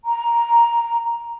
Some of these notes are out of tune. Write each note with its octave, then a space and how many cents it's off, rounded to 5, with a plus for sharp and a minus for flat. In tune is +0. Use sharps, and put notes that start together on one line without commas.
A#5 +5